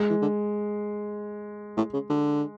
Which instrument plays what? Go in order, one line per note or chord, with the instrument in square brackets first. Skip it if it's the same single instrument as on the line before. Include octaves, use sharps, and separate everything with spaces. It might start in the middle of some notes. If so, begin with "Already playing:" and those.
Already playing: [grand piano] G#3
[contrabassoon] E3
D3
A2
C#3
D3